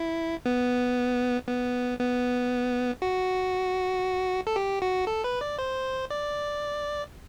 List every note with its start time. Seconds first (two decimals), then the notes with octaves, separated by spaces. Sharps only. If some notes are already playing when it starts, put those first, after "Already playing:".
Already playing: E4
0.46 B3
1.48 B3
1.99 B3
3.02 F#4
4.47 A4
4.56 G4
4.82 F#4
5.07 A4
5.24 B4
5.41 D5
5.59 C5
6.10 D5